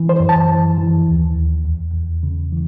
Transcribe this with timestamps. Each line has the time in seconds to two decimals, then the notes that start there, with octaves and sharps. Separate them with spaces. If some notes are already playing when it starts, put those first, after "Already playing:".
Already playing: E3
0.09 C5
0.20 F#2
0.29 A5
0.48 E3
0.78 E3
1.07 D#2
1.35 D#2
1.65 E2
1.94 E2
2.23 C#3
2.52 E3